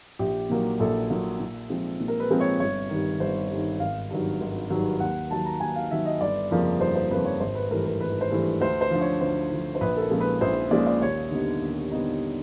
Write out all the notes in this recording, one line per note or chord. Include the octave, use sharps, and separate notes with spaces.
A#1 G4
A#2 F#3 A#3
A#1 A4
A#2 F#3 A#3
A#2
F3 G#3 C4
A#2
A#4
B4
F3 G#3 C4
C#5
G1 C#5
G2 D#3
G1 C5
G2 D#3
G#1 F5
G2 D#3 F#3
G#1
G2 D#3 F#3
D#2 F#5
D#3 F#3 A5
A#5
D#2 G#5
F5
D#3 F#3 E5
D#5
G1 D5
F2 C#3 F3 A#3
G1 C5
C5
F2 C#3 F3 A#3 B4
C#5
G#1 C5
B4
G2 E3 A3 A#4
A#4
G#1 B4
C5
G2 E3 A3
D2 C5
C5
D3 F3
C#5
D2 C5
D3 F3
C5
A#1 B4
A4
A#4
A#2 F3 G#3 C#4
B4
A#1 C5
A#2 F3 G#3 C#4 D5
D5
D#2 C#5
D3 G3 B3 D#4
D#2
D3 G3 B3 D#4